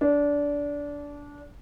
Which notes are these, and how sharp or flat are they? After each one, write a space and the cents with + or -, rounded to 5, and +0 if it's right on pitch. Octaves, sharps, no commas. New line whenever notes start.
D4 -20